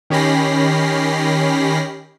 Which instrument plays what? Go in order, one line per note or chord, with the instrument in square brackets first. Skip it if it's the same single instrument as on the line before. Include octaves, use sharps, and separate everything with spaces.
[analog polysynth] D#3 C#4 G4 B5 A#6 C7